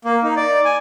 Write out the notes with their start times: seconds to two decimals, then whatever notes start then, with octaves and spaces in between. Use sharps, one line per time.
0.05 A#3
0.23 D#4
0.36 D5
0.65 G#5